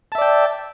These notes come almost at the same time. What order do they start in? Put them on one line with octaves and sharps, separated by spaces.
A5 E5 D5 G5